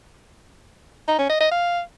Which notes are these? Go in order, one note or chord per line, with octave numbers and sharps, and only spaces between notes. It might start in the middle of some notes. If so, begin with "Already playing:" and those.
D#4
C#4
D#5
D#5
F5